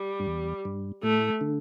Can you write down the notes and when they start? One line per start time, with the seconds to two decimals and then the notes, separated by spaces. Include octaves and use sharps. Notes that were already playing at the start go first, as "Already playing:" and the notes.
Already playing: G3
0.20 G2
0.27 E2
0.65 G2
1.03 A2 A3
1.41 D3